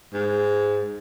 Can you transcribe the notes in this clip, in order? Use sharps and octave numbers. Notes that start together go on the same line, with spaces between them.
G#2